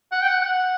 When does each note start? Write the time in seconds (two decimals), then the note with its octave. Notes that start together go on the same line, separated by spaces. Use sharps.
0.12 F#5
0.22 G5
0.28 F#5
0.41 F#5